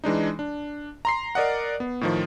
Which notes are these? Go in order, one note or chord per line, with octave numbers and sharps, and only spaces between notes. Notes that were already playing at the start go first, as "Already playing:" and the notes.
E3 G#3 D4 D#4
D4
A#5 C6 C7
A#4 D5 D#5 F#5
B3
A2 D#3 F3